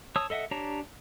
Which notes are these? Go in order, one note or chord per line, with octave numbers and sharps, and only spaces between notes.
C#5 A5 D#6 E6
A4 D#5 E5 F#5
D4 G4 C#5 A5 A#5